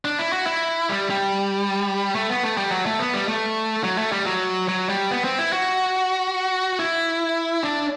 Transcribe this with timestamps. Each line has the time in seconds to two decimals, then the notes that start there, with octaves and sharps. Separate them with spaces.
0.05 D4
0.19 E4
0.32 F#4
0.46 E4
0.89 G3
1.10 G3
2.15 A3
2.29 B3
2.44 A3
2.57 G3
2.71 F#3
2.86 A3
2.99 B3
3.14 G3
3.28 A3
3.84 F#3
3.98 A3
4.12 G3
4.26 F#3
4.68 F#3
4.89 G3
5.11 B3
5.25 C4
5.39 E4
5.53 F#4
6.79 E4
7.63 D4